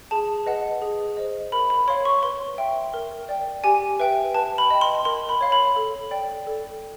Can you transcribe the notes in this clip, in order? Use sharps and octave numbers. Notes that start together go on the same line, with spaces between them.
G#4 A5
B4 D#5 F#5
G#4
C5 D#5
A#4 B5
B5
C#5 F5 C6
C#6
B4 C6
E5 G5
A#4
D5 G5
G4 G#5
B4 E5 G5
B4 A5
B5
D#5 G5
C6
A#4 C6
B5
C#5 F5
B5
A4
D5 G5
A4